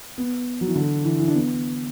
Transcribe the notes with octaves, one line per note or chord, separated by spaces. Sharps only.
B3
F#3
E3
D3
E3
E3
D4
B3